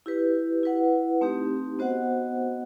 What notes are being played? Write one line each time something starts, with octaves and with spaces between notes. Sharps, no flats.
E4 G4 B4
E4 B4 F#5
A3 C4 D#4 G4
B3 F#4 C5 D#5 F#5